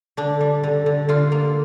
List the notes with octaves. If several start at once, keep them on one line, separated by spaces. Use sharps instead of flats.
D3 D4
G3
D3
D3
D3 F4
A#3